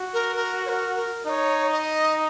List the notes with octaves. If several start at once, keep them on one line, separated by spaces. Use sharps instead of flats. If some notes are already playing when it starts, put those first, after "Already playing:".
Already playing: F#4
A#4
A#4
C#5
A#4
A#4
D#4 C#5 D#5
D#5